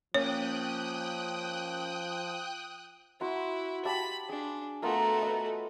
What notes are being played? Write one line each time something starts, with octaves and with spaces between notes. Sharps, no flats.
F3 A#3 C#4 C#5 G5 D#6 F#6
E4 F#4 C6
G4 F5 A5 B5
D4 G#4
A3 B3 F4 F#4 A#4
B4 D#5